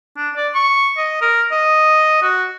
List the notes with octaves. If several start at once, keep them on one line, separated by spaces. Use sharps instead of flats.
D4
D5
C#6
D#5
A#4
D#5
F#4